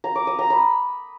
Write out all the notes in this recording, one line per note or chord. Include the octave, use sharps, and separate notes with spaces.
A#5
D6
D#6
A#5
B5